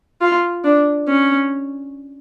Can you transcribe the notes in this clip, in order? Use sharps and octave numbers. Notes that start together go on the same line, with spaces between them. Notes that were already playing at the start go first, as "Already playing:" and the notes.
F4
D4
C#4